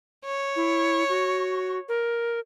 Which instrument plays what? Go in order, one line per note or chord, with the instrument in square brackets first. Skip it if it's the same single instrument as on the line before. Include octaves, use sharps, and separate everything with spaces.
[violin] C#5
[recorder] E4
F#4
A#4